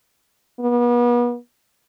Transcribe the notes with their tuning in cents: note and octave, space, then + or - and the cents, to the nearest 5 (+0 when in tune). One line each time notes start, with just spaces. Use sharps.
B3 -35